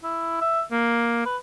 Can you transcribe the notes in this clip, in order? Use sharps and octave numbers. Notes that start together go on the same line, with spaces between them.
E4
E5
A#3
B4